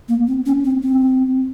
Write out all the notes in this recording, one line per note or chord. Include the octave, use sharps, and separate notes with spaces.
A#3
C4
C#4
C4
C4